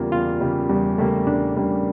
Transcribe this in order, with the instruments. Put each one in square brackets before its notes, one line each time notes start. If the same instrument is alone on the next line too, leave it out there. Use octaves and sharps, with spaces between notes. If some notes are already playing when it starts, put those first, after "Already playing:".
Already playing: [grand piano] E2 C#3 G3 A#3 [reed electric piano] F4
[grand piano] E2 [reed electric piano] F4
[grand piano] C#3 G3 A#3
[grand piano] E2 [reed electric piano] G3
[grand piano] C#3 G3 A#3 [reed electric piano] A3
[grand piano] E2 [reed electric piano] D4
[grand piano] C#3 G3 A#3